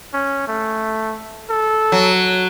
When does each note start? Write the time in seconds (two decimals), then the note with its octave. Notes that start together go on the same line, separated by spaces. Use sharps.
0.13 C#4
0.47 A3
1.49 A4
1.92 F#3